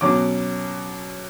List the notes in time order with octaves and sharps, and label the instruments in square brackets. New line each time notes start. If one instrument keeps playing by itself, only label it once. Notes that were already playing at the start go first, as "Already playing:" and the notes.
[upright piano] B2 F#3 C#4 D6